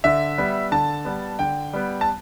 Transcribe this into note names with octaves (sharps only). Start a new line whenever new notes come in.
D3 E5
G3 B3
D3 A5
G3 B3
D3 G5
G3 B3
A5